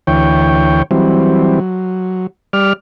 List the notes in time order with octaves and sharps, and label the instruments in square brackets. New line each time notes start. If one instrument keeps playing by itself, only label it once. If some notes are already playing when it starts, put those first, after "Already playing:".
[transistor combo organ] D2 E3 C#5 G5
E3 F#3 G3 C4
F#3
G3 D5 F6